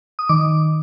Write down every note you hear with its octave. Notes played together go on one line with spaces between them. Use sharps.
D#6
D#3 D6